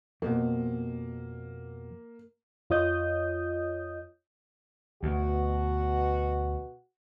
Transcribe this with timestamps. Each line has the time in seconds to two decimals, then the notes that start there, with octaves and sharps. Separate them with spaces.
0.22 F2 B2 A#3
2.70 F2 F4 C#5 D#5 D#6 G6
5.03 D2 B2 F#4